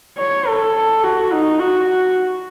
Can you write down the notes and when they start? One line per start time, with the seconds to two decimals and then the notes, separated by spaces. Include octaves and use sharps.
0.18 C#5
0.48 A4
1.04 F#4
1.32 D#4
1.60 F#4